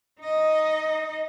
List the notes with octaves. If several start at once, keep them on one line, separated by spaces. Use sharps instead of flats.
D#4 D#5